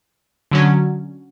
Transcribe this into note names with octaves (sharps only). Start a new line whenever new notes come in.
D3 F#3 C#4